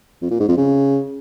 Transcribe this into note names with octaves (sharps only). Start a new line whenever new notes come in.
F2
A#2
G#2
F2
C#3